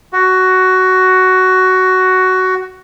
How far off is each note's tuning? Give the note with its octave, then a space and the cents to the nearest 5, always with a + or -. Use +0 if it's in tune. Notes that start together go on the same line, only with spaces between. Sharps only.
F#4 +10